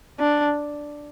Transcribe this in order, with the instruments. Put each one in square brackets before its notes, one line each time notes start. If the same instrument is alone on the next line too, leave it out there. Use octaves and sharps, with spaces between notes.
[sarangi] D4